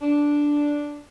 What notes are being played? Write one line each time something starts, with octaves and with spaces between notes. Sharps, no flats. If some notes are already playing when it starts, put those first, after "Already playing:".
D4